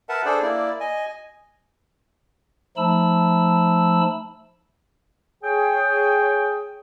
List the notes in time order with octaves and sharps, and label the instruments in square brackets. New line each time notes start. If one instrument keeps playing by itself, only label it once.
[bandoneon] A#4 B4 E5 F#5 A5
D4 G#4 A4 C5 D5
A#3 E4 D5
D#5 G#5
[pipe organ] F3 A3 D#4 A5 B5 E6
[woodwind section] G#4 C#5 G5